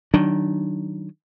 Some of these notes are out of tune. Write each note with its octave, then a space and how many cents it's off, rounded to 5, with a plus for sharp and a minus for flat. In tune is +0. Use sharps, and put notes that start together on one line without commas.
D#3 +0 F#3 +25 D4 +0